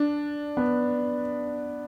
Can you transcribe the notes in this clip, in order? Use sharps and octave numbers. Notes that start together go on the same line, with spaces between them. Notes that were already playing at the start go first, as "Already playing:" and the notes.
Already playing: D4
B3